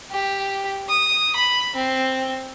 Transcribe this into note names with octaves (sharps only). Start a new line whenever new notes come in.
G4
D#6
B5
C4